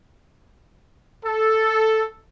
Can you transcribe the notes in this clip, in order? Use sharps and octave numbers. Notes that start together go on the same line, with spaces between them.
A4